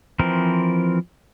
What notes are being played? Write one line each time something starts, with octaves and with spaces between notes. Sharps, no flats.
E3 F3 C4 A#4